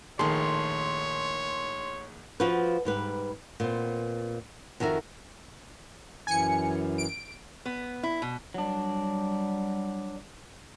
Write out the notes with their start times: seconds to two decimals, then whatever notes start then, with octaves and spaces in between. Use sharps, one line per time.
0.19 A#1 D#3 A3 G#4 C#5 A5 C6
2.40 F3 F4 F#4 B4
2.85 G#2 G3 B4
3.60 A#2 B3 C4
4.80 F2 D#3 F#4 A#4 E5
6.27 F#2 E3 G#5 C#7
6.98 D7
7.66 B3
8.03 E4
8.22 B2
8.54 F#3 G3 D4